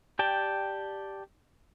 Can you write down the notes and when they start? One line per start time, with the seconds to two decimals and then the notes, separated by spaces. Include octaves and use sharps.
0.19 G4 D5 G5 A5